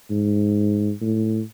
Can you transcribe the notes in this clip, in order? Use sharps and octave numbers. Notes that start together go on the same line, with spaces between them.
G#2
A2